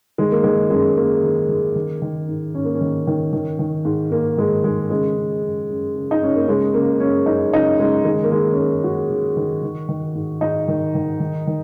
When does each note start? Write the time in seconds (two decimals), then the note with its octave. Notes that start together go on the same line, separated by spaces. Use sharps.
0.18 D#3 G#3
0.32 A#3
0.44 D#3 G#3
0.70 F#2 G#3
0.96 F#2 A#3
1.23 D#3
1.49 D#3
1.76 D#3
2.02 D#3
2.28 G#2
2.54 G#2 C#4
2.64 A#3
2.75 C#4
2.81 D#3
3.07 D#3
3.33 D#3
3.59 D#3
3.85 G#2
4.11 G#2 A#3
4.37 D#3 G#3
4.64 D#3 G#3
4.90 C#3 G#3
5.16 C#3
5.42 F#2
5.70 F#2
5.95 C#3
6.11 D#4
6.22 C#3 C#4
6.36 A#3
6.47 C#3 G#3
6.74 C#3 A#3
7.00 F#2 C#4
7.26 F#2 D#4
7.53 C#3 D#4
7.79 C#3 G#3
8.05 D#3 G#3
8.24 A#3
8.31 D#3 G#3
8.53 C#4
8.57 F#2 A#3
8.84 F#2 F#4
9.10 D#3
9.37 D#3
9.63 D#3
9.89 D#3
10.15 G#2
10.41 G#2 D#4
10.68 D#3
10.95 D#3
11.20 D#3
11.47 D#3